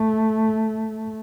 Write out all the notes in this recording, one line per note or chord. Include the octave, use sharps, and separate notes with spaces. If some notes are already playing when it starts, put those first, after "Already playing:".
Already playing: A3